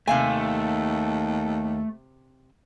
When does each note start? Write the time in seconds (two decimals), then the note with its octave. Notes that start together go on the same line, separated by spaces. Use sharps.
0.07 D#2 C3 A3 F5 G#5